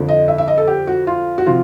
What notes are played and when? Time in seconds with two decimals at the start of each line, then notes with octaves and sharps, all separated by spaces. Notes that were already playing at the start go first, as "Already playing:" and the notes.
Already playing: F2 D3 F3
0.08 D#5
0.28 E5
0.38 E5
0.48 D#5
0.58 A4
0.67 G4
0.87 F#4
1.07 F4
1.38 F#4
1.46 C3 F3 F4